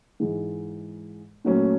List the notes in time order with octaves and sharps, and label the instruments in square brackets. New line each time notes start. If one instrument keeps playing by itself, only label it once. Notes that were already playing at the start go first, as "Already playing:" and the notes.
[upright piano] G#2 E3 G#3
A#2 F#3 A3 C#4